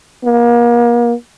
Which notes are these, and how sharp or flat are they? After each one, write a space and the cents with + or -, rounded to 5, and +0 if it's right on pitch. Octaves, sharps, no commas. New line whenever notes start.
A#3 +35